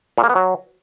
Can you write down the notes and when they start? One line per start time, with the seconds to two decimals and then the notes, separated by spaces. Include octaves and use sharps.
0.18 A#2
0.24 A#3
0.30 B3
0.35 F#3